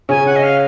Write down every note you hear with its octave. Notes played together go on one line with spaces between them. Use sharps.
C#3 C#4 G#5
F#5
D#5
F5